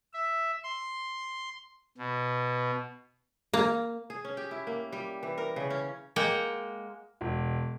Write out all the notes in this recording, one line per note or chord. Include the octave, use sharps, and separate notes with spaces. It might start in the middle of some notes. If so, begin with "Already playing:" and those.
E5
C6
B2
A#3
G#4
C#4
G4
E4
A#3
G3
E3
A#4
C#3
C#4
G#3 A#3 F#5 G5
E1